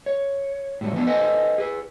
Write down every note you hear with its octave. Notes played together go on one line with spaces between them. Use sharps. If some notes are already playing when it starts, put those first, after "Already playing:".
C#5
A2 F#3 G3
E3 A#3 B3 D4
A4 B4 C5 D#5 F#5 G#5
G#4 B4